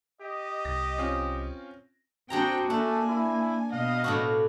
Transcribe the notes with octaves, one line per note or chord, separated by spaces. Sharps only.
G4 D#5
C2 A#6
C4 C#4 F4
C4 D4 F#4 G#4 G5 A#5
A3 A#3 D4 G#5
E4
B2 B3 D#5 F5
A2 D4 F#4